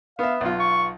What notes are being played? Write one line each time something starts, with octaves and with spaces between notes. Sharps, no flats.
B3 E5 F5
B1 B3 F4
C#6